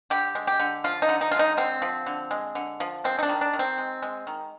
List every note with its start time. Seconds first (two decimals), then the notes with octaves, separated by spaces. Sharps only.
0.10 D3 G4
0.35 G#3
0.47 G4
0.60 D3
0.84 F3 F4
1.02 D#4
1.09 D3
1.21 D#4
1.31 G#3 F4
1.39 D#4
1.57 D3 C4
1.82 F3
2.06 D3
2.31 G#3
2.55 D3
2.80 F3
3.04 G#3 C4
3.19 D#4
3.23 D4
3.29 D#3
3.41 D4
3.53 D#3
3.59 C4
3.78 G#3
4.02 G#3
4.27 D#3